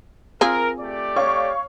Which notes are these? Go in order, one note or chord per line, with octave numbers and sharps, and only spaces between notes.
C4 F4 G#4 A#4
A3 G4 D5
C#5 F5 C#6